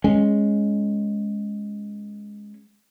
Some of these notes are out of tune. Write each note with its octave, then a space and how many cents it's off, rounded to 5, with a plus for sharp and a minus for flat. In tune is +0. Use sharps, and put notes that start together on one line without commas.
G#3 +0 C#4 +0